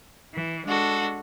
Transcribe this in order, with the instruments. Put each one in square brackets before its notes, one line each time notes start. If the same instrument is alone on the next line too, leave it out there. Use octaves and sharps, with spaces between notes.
[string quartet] E3
G#3 D4 F#4 A4